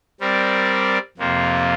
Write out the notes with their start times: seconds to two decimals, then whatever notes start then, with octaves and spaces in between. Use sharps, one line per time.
0.20 G3 C4 A#4 D5
1.18 F2 C3 F3 A#3 F4